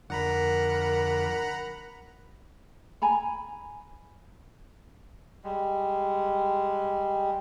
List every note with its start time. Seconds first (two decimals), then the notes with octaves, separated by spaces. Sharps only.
0.10 F2 D3 A#4 F#5 A#5 B5
3.02 G#5 A#5 B5
5.44 G3 G#3